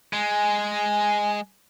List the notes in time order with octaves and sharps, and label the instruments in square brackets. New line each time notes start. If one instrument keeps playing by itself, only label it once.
[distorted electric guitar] G#3 [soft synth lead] G#5